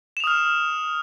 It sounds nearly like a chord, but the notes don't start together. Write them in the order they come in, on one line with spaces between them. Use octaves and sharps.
E7 F7 D#6 F6